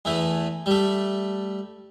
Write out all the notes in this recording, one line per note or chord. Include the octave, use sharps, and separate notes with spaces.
E2 E3 A3
G3 A3